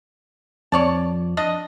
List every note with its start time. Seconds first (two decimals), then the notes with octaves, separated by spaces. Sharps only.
0.72 F2 C#5 D5 A5
1.37 D4 D#5